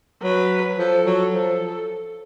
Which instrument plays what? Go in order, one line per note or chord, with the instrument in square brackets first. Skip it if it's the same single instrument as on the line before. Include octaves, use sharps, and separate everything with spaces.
[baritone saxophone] F#3 [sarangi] B4
[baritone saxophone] F3 [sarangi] A4
[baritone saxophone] F#3
[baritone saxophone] F3 [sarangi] A4